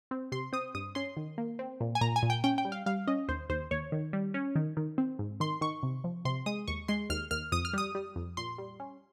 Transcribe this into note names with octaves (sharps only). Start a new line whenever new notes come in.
C4
C3 C6
C4 D#6
G2 D#6
C#4 C6
D#3
A#3
C4
A#2
G#5
A#2 A#5
G#5
A#2
G5
C#4 G5
G5
G3
F5
G3 F5
C#4 D#5
D#2 C5
D#2 C5
D#2 C#5
D#3
G3
C#4
D#3
D#3
C4
G#2
D#3 C6
D#3 C#6
C3
F3
C3 C6
G#3 D#6
D#2 C#6
G#3 C6
D#2 F6
D#2 F6
F2 D#6
F6
G3 D#6
G3
F2
A#2 C6
G3
C#4